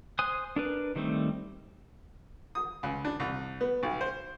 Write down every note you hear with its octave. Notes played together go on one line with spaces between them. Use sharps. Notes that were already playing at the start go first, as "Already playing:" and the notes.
C5 G#5 D#6 F#6
D4 A#4 B4
D#3 G3 A3 C4
D#6
C#2
D4
C2
B3
B1
C5